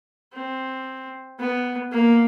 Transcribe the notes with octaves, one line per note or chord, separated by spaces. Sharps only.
C4
B3
A#3